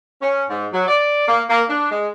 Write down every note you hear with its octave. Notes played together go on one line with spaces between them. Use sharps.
C#4
G#2
F#3
D5
A#3
A#3
D4
G#3